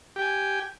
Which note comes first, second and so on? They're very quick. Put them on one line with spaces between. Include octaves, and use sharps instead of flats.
G4 G5 G#5